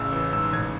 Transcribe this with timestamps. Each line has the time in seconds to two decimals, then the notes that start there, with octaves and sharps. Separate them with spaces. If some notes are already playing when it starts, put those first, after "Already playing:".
Already playing: A1 C#3 E6
0.12 E3 E6
0.33 G#2 E6
0.53 A1 G#6